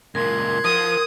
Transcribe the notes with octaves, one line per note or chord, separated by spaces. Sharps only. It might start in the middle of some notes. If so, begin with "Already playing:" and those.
C#2 A#2 A#4 C6 F#6 G#6
F3 A#4 D#6